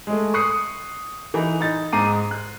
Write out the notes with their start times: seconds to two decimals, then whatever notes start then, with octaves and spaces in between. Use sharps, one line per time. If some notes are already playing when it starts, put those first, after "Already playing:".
0.07 G#3 A3
0.34 C#6 D#6 F#6 C7 C#7
1.34 E3 D#4
1.61 D#4 A6
1.93 G#2 D#4 A#5 D6 C7 D#7
2.31 F#6